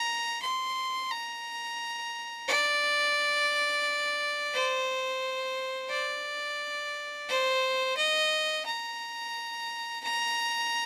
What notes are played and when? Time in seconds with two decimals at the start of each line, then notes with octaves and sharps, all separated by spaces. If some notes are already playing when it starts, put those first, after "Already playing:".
Already playing: A#5
0.42 C6
1.10 A#5
2.48 D5
4.54 C5
5.90 D5
7.29 C5
7.97 D#5
8.66 A#5
10.03 A#5